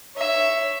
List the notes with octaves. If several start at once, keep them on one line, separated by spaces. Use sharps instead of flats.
C#5 E5